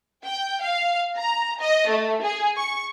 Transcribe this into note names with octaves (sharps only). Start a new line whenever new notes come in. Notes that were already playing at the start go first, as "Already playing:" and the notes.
G5
F5
A#5
D#5
A3
G#4
C#6